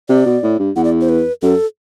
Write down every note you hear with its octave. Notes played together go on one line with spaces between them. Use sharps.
C3 D5
B2
A2
G2
E2 F#5
D5
C5
B4
F#2 A4